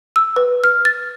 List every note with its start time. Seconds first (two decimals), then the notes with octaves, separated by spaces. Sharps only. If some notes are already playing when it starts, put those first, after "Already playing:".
0.16 E6
0.36 B4
0.64 F6
0.85 A6